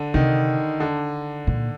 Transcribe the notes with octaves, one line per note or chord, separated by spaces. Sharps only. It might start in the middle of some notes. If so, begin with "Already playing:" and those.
Already playing: D3
C3 D#3
D3
A#2